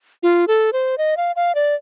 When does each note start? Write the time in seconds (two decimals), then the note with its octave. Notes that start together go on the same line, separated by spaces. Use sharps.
0.23 F4
0.48 A4
0.73 C5
0.98 D#5
1.17 F5
1.36 F5
1.55 D5